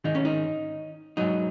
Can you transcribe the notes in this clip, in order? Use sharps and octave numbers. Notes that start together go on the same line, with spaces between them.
G#2 D#3 G#3 D#4
C#4
D#4
G#2 F#3 D#4